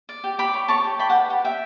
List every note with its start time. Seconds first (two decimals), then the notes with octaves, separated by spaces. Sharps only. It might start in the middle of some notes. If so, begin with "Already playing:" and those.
0.09 D5
0.24 G4
0.39 G4 B5 D6
0.54 C#5
0.68 C#5 A5 C#6
0.84 G4
0.99 D5 G5 B5
1.09 F#5 A5
1.15 B4
1.30 G4 F#5
1.44 G4 E5 G5